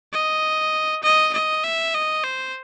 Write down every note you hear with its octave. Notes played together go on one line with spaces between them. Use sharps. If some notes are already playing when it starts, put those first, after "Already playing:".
D#5
D#5
D#5
E5
D#5
C5